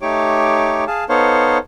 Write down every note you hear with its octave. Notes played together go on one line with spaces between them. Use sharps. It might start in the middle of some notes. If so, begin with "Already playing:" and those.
A3 D#4 G4 C#5 D6
G#4 F5 A5
B3 D#4 A4 C5 C#5 F5